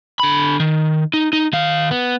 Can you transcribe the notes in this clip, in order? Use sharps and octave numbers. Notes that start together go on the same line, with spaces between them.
D3 B5
D#3
D#4
D#4
D#3 F5
B3